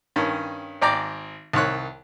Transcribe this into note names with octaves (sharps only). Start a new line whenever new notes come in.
G2 D#3 C#4
G#1 D5 G5 A#5 D6
C2 D#3 C#5 F#6